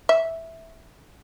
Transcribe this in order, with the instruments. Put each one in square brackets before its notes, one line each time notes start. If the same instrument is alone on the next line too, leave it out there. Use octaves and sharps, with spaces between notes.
[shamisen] E5